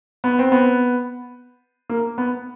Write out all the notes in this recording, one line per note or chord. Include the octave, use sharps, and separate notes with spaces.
B3
C4
B3
A#3
B3